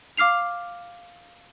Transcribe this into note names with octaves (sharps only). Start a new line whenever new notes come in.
F5 D6 F6 C7 F7